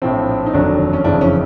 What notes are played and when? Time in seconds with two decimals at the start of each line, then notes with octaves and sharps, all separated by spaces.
0.02 A#1 A2 F3 C4
0.46 D#4
0.53 F1 D#2 D3 F#3 D4
0.93 C#4
1.04 F#1 F2 C#3 E3 D4
1.21 C#4